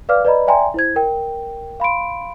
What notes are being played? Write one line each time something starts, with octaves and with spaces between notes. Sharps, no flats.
B4 D5 F5 D6 F6
B4 D5 D#5 A#5 B5
D5 E5 G5 G#5 A#5 C6
E4 C5 G#6
A#4 G5
F5 B5 C6 D7